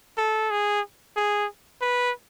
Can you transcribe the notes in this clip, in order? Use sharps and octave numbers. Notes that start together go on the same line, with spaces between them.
A4
G#4
G#4
B4